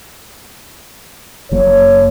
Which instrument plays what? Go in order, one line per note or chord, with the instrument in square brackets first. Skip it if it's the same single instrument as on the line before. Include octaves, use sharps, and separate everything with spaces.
[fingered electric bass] F#1 F#3 A#3 [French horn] C#5